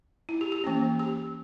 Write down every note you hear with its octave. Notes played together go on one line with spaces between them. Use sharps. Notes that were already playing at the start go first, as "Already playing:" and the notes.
E4
G4
G4
E3 A#3 C#4
G4